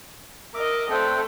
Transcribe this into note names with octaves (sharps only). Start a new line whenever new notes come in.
A#4 D#5 E5 D6
A3 C4 D4 G5